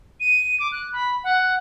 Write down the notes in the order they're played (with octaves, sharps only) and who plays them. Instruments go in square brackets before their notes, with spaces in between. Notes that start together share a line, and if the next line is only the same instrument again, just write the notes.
[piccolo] D#7
D6
F#6
B5
F#5